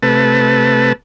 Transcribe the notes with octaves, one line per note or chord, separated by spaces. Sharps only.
C3 A3 B4 A5